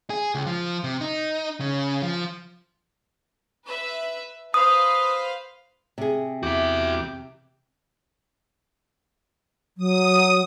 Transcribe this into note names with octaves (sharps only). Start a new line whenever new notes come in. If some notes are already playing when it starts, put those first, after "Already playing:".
G#4
C#2
F3
C3
D#4
C#3
F3
B4 E5
B4 C5 F5 D#6
C3 G#4
E2 F#4 G4 E5 D6
F#3 D#6